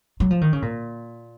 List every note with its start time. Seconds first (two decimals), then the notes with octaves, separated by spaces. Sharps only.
0.20 F#3
0.30 F3
0.41 D#3
0.53 C#3
0.62 A#2